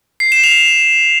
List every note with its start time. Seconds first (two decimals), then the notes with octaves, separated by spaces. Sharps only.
0.20 C7
0.32 E7
0.44 F7